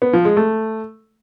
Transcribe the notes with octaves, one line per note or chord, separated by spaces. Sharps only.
B3
F3
G#3
A3